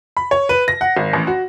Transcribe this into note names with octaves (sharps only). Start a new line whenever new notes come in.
B5
C#5
B4
A#6
F#5
G#1
A1
F#4